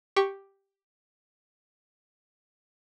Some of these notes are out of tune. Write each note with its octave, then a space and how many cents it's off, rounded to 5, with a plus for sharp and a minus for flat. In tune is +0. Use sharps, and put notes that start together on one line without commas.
G4 +0 C#6 +0